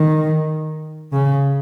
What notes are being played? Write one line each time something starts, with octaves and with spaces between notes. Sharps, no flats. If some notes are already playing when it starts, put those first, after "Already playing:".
Already playing: D#3
C#3